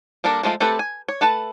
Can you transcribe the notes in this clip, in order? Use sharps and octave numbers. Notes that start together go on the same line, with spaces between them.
G3 A#3 D4 A4 A#4
F3 G#3 A3 F4
A3 C4 G4 A4 B4
G#5
C#5
A3 A4 B4 A5